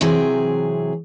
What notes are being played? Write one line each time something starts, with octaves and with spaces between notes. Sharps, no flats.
C3 E3 F#3 C4 G#4